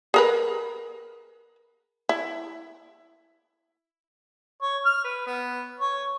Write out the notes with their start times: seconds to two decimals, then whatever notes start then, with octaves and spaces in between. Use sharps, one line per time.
0.14 G#4 A#4 B4
2.09 E4
4.62 C#5
4.85 F6
5.04 B4
5.26 B3
5.79 C#5